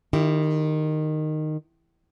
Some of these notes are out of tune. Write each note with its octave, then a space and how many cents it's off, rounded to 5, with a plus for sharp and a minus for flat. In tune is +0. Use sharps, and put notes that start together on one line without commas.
D#3 -15 E4 +20 G4 +10